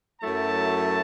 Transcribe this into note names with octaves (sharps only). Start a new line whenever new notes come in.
F#2 F#3 A3 E4 A5